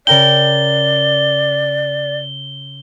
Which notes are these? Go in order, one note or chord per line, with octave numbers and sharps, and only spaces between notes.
C#3 A#4 D5 G5 G7